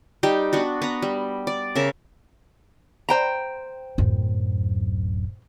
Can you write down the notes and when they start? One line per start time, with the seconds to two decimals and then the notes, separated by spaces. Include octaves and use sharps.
0.23 G3 D#4 G4
0.53 B3 D4 F#4
0.82 B3 A#5
1.02 G3
1.47 D5
1.75 C#3 A#4 E5
3.09 C5 G5 A#5
3.98 D1 F#2